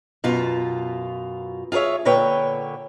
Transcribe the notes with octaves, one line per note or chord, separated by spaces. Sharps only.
F#2 B2 F4
F4 G#4 A4 C#5 E5
A#2 D3 B4 C#5 G5